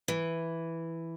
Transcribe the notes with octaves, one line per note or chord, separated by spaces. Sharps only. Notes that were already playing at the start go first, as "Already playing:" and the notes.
E3